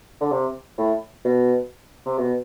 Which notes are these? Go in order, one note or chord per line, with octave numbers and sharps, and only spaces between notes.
D3
C3
A2
B2
C3
B2